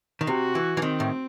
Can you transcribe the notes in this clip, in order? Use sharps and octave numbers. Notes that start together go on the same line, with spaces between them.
D#3
C3 F#4
E3
E3
D#3 C4
A2